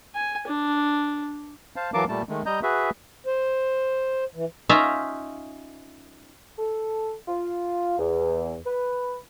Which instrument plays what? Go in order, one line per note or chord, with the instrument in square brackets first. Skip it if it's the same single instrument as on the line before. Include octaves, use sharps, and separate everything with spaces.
[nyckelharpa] G#5
D4
[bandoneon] C5 F5 A5
E3 F#3 A#4 F5 A5 D6
A#2 G3 A3 A5
D#3 G#3 A3
G3 D#5 A#5 G6
F#4 G#4 B4 E5
[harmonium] C5
E3
[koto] C#4 D#4 F4 E5 A#5
[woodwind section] A4
F4
E2
B4